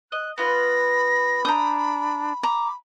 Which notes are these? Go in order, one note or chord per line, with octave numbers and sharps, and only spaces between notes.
D#5 F#6
B3 F4 B4 B5 A#6
D4 A#5 D#6 G6
A#5 D6